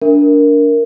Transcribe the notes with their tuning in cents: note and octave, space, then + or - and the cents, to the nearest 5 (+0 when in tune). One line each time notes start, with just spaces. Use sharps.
D4 -15 A#4 +0 E5 +0